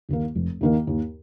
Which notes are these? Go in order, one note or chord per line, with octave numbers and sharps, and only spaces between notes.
D#2 D#3 A#3
F1
D#2 D#3 A#3
D#2